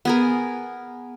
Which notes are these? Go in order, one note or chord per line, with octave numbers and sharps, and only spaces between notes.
B3 G#4 A#4